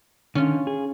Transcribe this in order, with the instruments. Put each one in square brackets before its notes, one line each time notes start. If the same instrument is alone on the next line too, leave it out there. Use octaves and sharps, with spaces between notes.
[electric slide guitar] D3 D#3 [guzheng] C#4 F4
[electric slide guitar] G#4